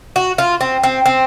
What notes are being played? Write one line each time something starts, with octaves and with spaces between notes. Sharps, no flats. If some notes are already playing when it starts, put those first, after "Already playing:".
F#4
F4
C4
C4
C4